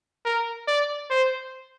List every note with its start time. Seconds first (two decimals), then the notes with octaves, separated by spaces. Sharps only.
0.25 A#4
0.68 D5
1.10 C5